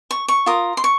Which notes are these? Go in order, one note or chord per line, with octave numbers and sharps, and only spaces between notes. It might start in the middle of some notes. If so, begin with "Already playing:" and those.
C#6
C#6
F4 A#4 D#6
C6
C#6